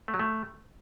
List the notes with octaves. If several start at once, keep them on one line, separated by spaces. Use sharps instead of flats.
A3
F#3
A3